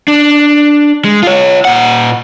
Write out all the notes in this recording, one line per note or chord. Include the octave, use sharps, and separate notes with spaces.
D4
G#3
F4 C#5
A#2 F#5